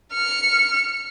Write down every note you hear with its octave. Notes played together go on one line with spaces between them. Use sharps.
F6 C#7